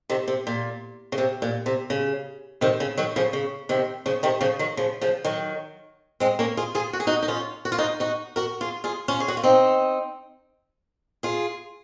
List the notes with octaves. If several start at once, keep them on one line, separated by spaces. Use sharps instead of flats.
C3 D#3
C3
A#2
C#3
C3
A#2
C3
C#3
C3 D#3
C#3
D#3 F#3
C#3 F3
C#3
C3 D#3
C#3 F3
C3 D#3
C#3 F3
D#3 F#3
C#3 F3
C#3 F3
D#3 F#3
G#3 C4
A#3 C#4
F4 G#4
F4 G#4
F#4
G#4
D#4 F#4
D#4
C#4 F4
F#4
F4
D#4 F#4
D#4 F#4
F#4 A#4
F4 G#4
F4 G#4
C#4 F4
G#4
F#4
F4
C4 D#4
F4 G#4